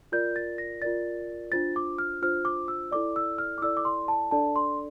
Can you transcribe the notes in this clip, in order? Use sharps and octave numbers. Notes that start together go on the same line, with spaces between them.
F4 A#4 D5 G6
A6
A#6
F4 A#4 D5 A6
D4 F4 C5 A6
D6
F6
D4 F4 C5 F6
D6
E6
E4 A4 D5 D6
E6
F6
D6
E4 A4 D5 E6
D6
C6
A5
D4 A4 D5 A5
C6